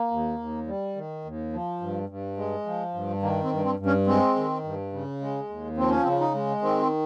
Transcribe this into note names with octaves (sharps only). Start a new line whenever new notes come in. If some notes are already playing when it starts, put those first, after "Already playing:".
Already playing: A#3
D#2
D#2
G3
D#3
D#2
F3
G2
G2
G#3
F3
G2
D#3 A#3
C4
G2
C4
G2
C#4
G#3 C4
D#3
G2
C#3
G#3
D#2
F3 C4
C#4
C4
C#3
D#4
G#3
D#3 C4